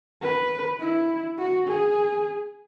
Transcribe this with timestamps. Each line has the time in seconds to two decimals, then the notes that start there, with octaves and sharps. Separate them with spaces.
0.22 B4
0.80 E4
1.39 F#4
1.68 G#4